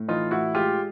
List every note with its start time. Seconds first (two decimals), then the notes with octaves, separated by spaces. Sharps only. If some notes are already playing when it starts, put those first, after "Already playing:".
Already playing: A2
0.08 E3 D#4 F4
0.31 A2 E4 F#4
0.55 G#3 F4 G4